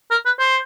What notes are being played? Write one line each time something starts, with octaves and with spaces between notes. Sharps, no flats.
A#4
B4
C5